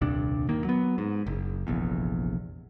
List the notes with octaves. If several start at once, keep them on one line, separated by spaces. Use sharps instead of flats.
D#1 C2 G2 D4
D#2 D#3 A#3
F#3 B3
G#2
F#1
F1 A#1 E2